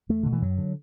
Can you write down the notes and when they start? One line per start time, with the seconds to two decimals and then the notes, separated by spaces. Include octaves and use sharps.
0.09 E2 A3
0.23 B2 D3
0.33 E3
0.42 F#2 F#3
0.58 D3